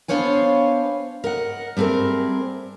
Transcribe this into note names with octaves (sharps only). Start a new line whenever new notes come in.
B3 D4 C5 C#5 F5 G#5
A#4 D#5 F#5
G3 A3 C4 G#4 A#4